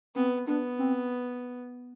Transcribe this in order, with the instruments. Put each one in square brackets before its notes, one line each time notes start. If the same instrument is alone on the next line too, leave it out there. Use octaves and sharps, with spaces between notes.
[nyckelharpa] B3 [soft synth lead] C4
[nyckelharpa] B3 [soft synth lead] D4
[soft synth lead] C4